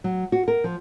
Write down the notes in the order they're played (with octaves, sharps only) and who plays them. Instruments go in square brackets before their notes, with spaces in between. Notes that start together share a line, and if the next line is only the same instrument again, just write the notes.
[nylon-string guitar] F#3
F#4
A#4
F3